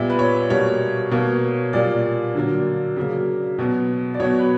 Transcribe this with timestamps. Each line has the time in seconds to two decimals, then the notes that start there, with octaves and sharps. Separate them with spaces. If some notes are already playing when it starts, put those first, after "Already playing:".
Already playing: A#2 G3 B3 E5
0.10 B4
0.19 C#5
0.50 B2 G3 A#3 C#5
1.11 B2 A#3
1.73 A#2 G3 A#3 D5
2.35 D3 F#3 A#3
2.96 C#3 F#3 A#3
3.58 B2 F#3 B3
4.14 D5
4.20 B2 F#3 B3 C#5
4.39 B4